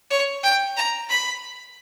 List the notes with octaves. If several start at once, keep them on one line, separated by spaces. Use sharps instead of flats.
C#5
G5
A#5
B5